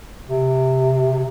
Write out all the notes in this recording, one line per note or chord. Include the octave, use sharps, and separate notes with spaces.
C3